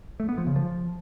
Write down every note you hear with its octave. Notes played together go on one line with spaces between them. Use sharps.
A3
B3
F3
C#3
F3